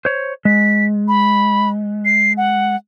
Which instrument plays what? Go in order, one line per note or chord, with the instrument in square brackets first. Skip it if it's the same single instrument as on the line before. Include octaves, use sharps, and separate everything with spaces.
[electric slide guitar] C5 C#5
[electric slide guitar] G#3 [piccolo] B6
[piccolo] B5
C7
F#5